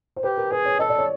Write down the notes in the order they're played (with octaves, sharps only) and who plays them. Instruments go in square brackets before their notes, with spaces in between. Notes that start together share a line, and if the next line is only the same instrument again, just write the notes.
[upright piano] C5
[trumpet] G4 [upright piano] B4
[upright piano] A#4
[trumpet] G#4 [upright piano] B4
[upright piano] C#5
[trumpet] A4 [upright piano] D#5
[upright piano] D5
C#5